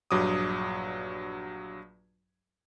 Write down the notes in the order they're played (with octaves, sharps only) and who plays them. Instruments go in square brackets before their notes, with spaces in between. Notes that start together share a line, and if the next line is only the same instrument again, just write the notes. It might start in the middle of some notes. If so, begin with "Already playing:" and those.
[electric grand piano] A#1 G2 F#3 D6 D#6